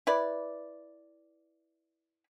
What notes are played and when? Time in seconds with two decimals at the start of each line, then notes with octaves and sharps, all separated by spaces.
0.07 E4 B4 D5